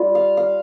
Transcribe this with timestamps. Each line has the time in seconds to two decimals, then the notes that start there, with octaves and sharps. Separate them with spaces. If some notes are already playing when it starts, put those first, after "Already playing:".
Already playing: G3 F4
0.15 F5
0.37 F5